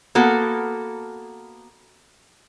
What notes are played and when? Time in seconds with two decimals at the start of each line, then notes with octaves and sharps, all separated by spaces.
0.15 A#3 B3 F#4 A4